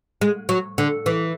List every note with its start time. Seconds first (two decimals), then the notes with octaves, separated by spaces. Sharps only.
0.21 G#3
0.49 F#3
0.78 D3
1.06 E3